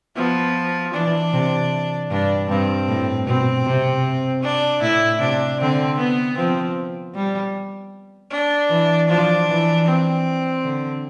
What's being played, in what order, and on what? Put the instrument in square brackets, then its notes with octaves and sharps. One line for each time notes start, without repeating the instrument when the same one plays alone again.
[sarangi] F3 [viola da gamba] B3
[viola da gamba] E3 [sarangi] D4
[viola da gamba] C3
[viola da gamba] G2 [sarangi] D4
[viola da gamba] G2 [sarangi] C4
[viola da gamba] A2
[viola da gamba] B2 [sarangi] C4
[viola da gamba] C3
[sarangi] D4
[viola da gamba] A2 [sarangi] E4
[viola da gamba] C3 [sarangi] D4
[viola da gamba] D3 [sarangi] C4
[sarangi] B3
[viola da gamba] F3 [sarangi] C4
[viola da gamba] G3
[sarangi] D4
[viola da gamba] E3
[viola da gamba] F3 [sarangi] D4
[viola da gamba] E3
[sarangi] C4
[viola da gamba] D3